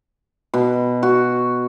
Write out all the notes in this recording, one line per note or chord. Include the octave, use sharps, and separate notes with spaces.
B2
F#4